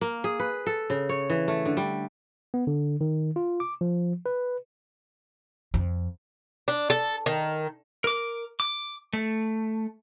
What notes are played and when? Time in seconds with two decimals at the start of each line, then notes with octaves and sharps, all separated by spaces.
0.01 A#3
0.24 G#4
0.39 B4
0.67 A4
0.90 C#3
1.09 C#5
1.30 E3
1.48 A3
1.66 D3
1.77 G3
2.54 B3
2.67 D3
3.01 D#3
3.36 F4
3.60 D6
3.81 F3
4.26 B4
5.74 F2
6.68 D4
6.90 A4
7.26 D#3
8.04 A#4 D6
8.60 D6
9.13 A3